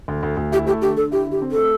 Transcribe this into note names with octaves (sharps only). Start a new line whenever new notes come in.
D2
D2
D2
E4 G4
A3 G4
D3 G4
D3 A4
E4 G4
D3 G4
C4
A4
A3